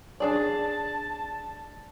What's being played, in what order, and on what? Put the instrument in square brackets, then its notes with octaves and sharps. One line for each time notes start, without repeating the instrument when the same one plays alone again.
[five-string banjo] D4 G#4 D5 [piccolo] A5